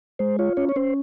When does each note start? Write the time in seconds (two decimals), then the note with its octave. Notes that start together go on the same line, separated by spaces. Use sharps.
0.19 G#3 C5
0.39 F4 C#5
0.57 C#4 C#5
0.69 C#5
0.76 C#4 C5